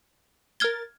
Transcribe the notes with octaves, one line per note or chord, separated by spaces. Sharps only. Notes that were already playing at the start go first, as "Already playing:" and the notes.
A#4 F6 G#6 A6 G7